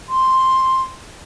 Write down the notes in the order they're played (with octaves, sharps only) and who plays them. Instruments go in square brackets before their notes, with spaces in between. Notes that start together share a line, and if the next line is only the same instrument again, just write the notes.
[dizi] C6